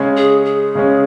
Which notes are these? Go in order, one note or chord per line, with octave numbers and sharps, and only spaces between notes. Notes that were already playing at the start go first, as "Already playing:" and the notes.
Already playing: C#3 G#3 C#4
G#4
G#4
C#3 G#3 C#4